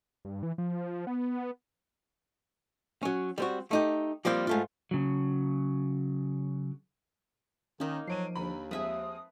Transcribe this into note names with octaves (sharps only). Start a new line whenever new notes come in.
G2
E3
F3
B3
F#3 C#4
G3 C4 F#4
A3 D#4 G4
F3 G3 A#3 C4 F4
G#2 A3 F4
C#3 F#3
D#3 A#3 C#4 D#4
F3 F#3 C7 D7 D#7
D#2 D3 A#5 B5
F3 G#3 C4 B4 E5 G#5 D#6